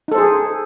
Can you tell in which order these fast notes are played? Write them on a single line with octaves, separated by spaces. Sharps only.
D#4 A4 C5 G#4